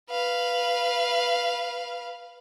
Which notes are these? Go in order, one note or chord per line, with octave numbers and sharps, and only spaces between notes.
B4 F5